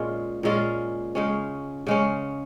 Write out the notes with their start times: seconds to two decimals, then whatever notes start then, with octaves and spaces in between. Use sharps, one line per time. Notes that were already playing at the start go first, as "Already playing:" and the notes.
Already playing: A#2 G#3 C#4 F4
0.43 A#2 G#3 C#4 F4
1.15 C#3 G#3 C#4
1.87 C#3 G#3 C#4